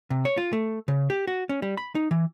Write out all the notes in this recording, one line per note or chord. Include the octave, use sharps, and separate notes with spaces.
C3
C#5
F4
A3
C#3
G4
F#4
C#4
G3
B5
D#4
E3